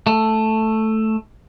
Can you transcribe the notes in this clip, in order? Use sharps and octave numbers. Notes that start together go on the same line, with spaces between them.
A3